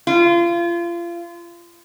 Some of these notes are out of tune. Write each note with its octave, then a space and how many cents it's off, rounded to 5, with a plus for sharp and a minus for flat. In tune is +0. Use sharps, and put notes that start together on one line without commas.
F4 -30